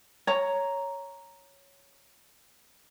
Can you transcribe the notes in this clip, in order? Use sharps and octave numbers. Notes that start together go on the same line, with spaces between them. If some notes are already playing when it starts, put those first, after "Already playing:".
C#5 A#5